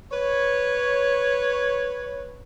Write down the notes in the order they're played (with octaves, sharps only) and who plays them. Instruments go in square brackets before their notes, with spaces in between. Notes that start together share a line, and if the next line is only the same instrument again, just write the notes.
[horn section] B4 C#5